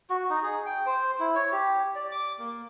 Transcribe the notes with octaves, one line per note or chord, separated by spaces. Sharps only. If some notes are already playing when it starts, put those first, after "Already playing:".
F#4
D#4
G#4
G5
C5
E4
C#5
G4
D5
D6
A#3